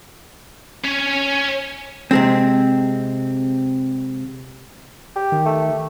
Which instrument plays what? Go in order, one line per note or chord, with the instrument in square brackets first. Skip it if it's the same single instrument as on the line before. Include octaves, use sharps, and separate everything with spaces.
[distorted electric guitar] C#4 C#5
[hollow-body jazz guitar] C3 G#3 C4
[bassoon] G4
[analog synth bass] D#3
[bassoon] A3